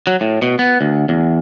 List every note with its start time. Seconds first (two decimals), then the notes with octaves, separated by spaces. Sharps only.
0.07 F#3
0.21 A2
0.42 B2
0.59 B3
0.81 D2
1.09 E2